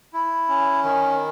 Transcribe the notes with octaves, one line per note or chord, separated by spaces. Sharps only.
E4
C#4
D#3